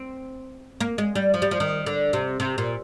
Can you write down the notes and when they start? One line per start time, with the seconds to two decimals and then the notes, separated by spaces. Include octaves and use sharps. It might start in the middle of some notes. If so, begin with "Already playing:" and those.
Already playing: C4
0.80 A#3
0.98 G#3
1.15 G3
1.34 F3
1.42 G3
1.51 F3
1.60 D#3
1.86 D3
2.13 C3
2.40 C3
2.58 A#2